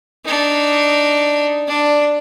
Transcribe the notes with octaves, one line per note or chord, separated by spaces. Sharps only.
D4 D#4
D4